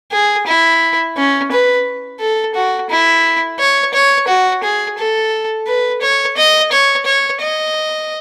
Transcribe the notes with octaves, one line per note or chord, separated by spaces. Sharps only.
G#4
E4
C#4
B4
A4
F#4
E4
C#5
C#5
F#4
G#4
A4
B4
C#5
D#5
C#5
C#5
D#5